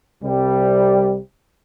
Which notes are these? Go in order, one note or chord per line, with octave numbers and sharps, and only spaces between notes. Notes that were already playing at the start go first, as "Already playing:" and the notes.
C2 C3 G3